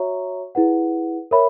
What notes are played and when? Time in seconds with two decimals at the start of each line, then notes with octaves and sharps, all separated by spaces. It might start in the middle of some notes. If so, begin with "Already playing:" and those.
Already playing: F#4 C#5 E5 A#5 C#6
0.55 E4 G#4 B4 F#5
1.31 A#4 C#5 E5 B5